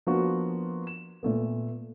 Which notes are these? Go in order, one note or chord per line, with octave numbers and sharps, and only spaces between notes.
F3 A#3 B3 D4 F4 F#4
E7
A#2 A3 B3